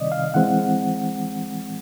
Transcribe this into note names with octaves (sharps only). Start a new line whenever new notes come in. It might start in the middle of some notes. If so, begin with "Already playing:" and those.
Already playing: C3 D#3 G3 C4 D5 D#5
F5
E3 G#3 C4 F#5